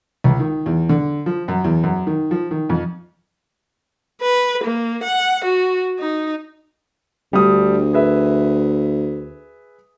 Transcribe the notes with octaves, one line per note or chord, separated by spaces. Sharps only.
C#2
D#3
E2
D3
F3
F#2
E2
F#2
D#3
F3
D#3
F2
B4
A#3
F#5
F#4
D#4
D2 G3 D4 D#6
G#4 B4 E5